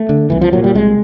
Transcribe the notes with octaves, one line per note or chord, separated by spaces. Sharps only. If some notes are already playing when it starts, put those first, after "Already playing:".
Already playing: A3
D3
C2 E3
F3
A#2 F#3
G3
C2 G#3